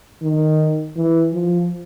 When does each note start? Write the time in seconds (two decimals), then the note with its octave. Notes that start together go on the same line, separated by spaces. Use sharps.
0.22 D#3
0.96 E3
1.33 F3